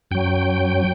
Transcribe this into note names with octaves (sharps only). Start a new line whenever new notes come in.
F#2 F#3 G5